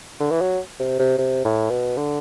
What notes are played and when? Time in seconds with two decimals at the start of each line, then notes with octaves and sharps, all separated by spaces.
0.20 D3
0.30 E3
0.41 F#3
0.79 C3
0.99 C3
1.18 C3
1.45 A2
1.70 B2
1.97 D3